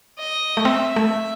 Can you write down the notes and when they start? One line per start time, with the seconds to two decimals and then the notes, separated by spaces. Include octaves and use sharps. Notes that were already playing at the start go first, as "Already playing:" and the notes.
0.19 D#5
0.57 A3
0.65 C4 E5
0.96 A3